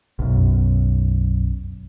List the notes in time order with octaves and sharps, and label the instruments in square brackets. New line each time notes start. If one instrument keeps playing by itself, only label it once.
[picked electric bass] B1 F#2